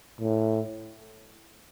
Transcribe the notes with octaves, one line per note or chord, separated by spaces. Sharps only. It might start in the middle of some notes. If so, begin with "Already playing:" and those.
A2